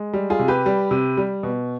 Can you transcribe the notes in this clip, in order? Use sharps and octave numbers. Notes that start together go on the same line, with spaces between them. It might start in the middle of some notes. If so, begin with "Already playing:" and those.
Already playing: G#3
G3
F4 G#4
C3
G4 B4
G3
C3
G3
B2